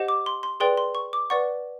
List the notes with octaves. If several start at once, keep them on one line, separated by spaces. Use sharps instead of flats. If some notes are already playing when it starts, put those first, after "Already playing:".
Already playing: G4 C5 D#5 F#5
D6
C6
C6
G#4 B4 D5 G5 C6
C6
C#6
D6
B4 D5 F#5 C#6